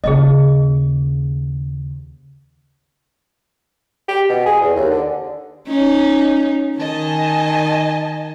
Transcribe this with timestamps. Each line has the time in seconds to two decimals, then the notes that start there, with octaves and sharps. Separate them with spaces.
0.04 D#2 C#3 G#4 D#5
4.09 G4
4.29 B2
4.46 G#4
4.61 E2
4.76 D#2
4.90 D3
5.68 C#4 D#4
6.79 D#3 D#5 G#5 A5